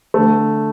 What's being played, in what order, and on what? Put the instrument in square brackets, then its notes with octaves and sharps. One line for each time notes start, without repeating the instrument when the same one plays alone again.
[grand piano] A3
D3